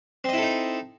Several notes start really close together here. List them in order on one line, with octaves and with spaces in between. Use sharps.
C4 D#5 E4 A4 D#4